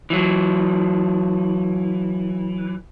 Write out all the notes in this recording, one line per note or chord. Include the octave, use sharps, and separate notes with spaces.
E3 F#3